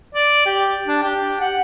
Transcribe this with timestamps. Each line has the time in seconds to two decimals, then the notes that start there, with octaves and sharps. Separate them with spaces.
0.15 D5
0.45 G4
0.87 D4
1.03 G4
1.40 F#5